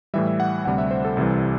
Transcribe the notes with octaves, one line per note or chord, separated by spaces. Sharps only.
A2 E3 G3 E5
E5
F#5
D2 C3 G3 F#5
E5
C5
A4
C2 C3 E3 G3